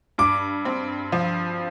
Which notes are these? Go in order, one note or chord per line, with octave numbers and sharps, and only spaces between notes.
G2 D6
C4
F3